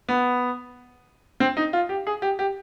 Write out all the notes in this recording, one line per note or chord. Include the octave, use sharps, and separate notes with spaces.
B3
C4
D#4
F4
G4
G#4
G4
G4